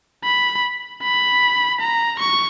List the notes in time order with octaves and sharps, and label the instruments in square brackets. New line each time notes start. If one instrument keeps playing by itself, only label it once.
[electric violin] B5
B5
A#5
C#6